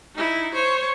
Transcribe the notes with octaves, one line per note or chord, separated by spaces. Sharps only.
D#4 E4
C5 C#5